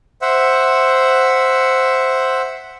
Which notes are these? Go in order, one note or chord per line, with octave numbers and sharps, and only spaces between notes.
C5 E5 F#5